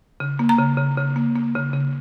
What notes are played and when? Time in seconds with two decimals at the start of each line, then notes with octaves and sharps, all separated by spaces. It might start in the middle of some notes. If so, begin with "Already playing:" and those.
0.20 C#3
0.39 A#3
0.49 A#5
0.58 C#3
0.77 C#3
0.97 C#3
1.16 A#3
1.36 A#3
1.55 C#3
1.73 C#3